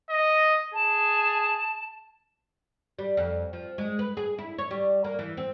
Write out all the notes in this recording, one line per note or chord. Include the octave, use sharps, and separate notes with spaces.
D#5
G#4 A5
G3
F2
F3
G#3
B4
G#4
E4
C#5
G3
A#3
E3
C4